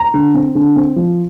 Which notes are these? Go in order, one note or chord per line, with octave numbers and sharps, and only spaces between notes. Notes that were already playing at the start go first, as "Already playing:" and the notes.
Already playing: A#5
D3
C4
D3
C4
F3